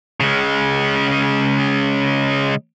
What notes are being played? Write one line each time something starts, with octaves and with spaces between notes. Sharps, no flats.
C#3 G#3